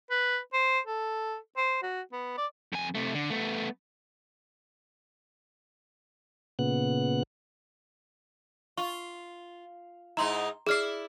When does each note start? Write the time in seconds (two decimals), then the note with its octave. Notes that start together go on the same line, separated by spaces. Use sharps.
0.10 B4
0.53 C5
0.87 A4
1.57 C5
1.82 F#4
2.12 B3
2.38 D5
2.73 F2 G#5
2.95 C3 A3
3.15 D3
3.30 A3 B3
6.59 A#2 C#3 B3 F#6
8.78 F4 C#6
10.17 G#2 D#4 E4 A#5 C6
10.67 E4 G#4 D5 F6 C7